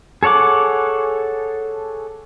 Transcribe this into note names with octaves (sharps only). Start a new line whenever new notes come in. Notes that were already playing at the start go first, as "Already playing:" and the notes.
G#4 A4 C#5 F#5 D6